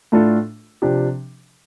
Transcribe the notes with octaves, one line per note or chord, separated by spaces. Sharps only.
A2 A3 D4 F4 A4
C3 F3 D4 G4